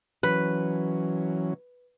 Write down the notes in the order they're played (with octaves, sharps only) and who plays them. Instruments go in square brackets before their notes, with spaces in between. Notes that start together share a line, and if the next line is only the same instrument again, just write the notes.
[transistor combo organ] E3 F#3 C#4 [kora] B4